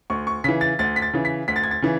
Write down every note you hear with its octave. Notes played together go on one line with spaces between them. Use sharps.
D2 C#6
C#6
C#3 E3 B6
A6
D2 A6
B6
A6
C#3 E3
B6
D2 B6
A6
G#6
A6
C#3 E3